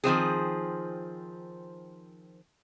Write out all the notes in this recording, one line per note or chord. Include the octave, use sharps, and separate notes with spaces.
D#3 F3 C4 G#4